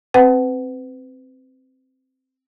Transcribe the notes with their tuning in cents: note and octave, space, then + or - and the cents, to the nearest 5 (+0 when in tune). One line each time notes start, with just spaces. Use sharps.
C4 +0 B4 +30 F#5 +25